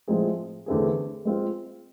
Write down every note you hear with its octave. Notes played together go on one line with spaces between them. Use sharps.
A2 F3 G#3 C4 G#4
E2 D3 A3 C4 G#4
G#3 C4 F4